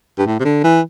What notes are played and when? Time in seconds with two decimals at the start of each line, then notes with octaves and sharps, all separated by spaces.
0.19 G2
0.26 A2
0.40 C3
0.45 D3
0.64 E3